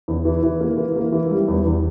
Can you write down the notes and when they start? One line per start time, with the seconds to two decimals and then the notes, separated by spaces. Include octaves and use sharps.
0.08 E2
0.25 E3
0.43 E3
0.61 A#3
0.77 E3
0.96 A#3
1.12 E3
1.31 G3
1.48 E2
1.65 E2